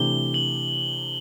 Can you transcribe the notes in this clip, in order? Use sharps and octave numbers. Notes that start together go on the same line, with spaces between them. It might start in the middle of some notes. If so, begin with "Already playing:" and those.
Already playing: C3 E3 A3 D4 G4 G7
F#7